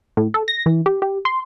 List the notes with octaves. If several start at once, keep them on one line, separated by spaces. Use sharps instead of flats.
A2
A4
A#6
E3
G4
G4
C6